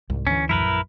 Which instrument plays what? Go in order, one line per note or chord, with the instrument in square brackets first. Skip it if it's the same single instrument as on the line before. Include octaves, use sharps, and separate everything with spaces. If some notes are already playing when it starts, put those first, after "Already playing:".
[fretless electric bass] C2 [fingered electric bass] G#2
[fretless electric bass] D2 E3 [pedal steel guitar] C#4
[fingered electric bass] A#1 F#2 F#3 [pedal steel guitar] E4 A#4 B4